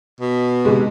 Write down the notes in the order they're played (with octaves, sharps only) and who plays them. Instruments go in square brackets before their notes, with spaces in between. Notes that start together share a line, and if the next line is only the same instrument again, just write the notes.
[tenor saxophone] B2
[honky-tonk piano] C3 G#3